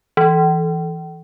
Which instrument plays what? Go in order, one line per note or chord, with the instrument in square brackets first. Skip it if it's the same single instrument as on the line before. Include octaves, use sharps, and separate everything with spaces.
[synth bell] E3